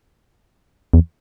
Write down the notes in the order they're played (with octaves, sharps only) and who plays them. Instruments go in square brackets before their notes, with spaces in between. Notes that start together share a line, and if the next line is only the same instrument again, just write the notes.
[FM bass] E2